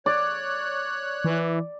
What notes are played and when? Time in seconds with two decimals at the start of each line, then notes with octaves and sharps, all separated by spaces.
0.06 C#5 D5 F#6
1.24 E3